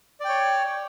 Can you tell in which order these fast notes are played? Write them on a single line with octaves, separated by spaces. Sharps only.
D5 G5 C#5